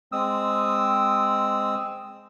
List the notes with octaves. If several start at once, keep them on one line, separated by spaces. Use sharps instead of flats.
G#3 C4 D#6 E6